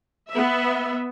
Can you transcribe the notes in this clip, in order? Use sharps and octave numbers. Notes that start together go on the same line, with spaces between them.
B3 E5